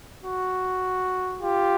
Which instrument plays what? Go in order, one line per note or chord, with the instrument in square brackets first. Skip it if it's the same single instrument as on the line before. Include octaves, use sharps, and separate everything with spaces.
[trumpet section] F#4
F4 G4